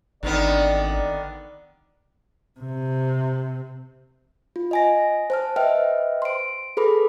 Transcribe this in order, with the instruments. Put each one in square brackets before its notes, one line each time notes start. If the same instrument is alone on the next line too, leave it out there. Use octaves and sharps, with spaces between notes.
[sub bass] G#1 [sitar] D3 D#3 B3 [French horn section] D5
[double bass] C3
[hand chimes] F4
D#5 G#5 A#6
C5 A5 F6
B4 C5 D#5 E5 G5 F6
C6 D7
G#4 A4 B4 B5 D6